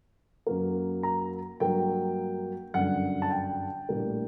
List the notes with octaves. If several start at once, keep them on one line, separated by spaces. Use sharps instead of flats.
F#2 F#3 A#3
A#5
G2 F#3 A#3 G5
G1 F#2 D3 F#5
A5
G5
A#1 A2 G3 A#3